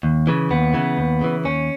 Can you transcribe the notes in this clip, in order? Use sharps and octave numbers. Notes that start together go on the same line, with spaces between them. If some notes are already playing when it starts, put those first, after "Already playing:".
D#2
C#3 E3
D#2 B3
C#3 E3
D#2
C#3 E3
D#2 C#4